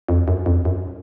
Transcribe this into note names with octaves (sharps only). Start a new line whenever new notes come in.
F2
F#2
F2
F#2